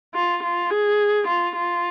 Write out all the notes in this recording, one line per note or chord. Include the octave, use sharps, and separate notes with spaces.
F4
F4
G#4
F4
F4